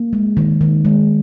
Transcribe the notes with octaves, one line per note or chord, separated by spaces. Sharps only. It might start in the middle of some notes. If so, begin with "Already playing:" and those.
Already playing: A#3
G#3
D#3
D#3
G#3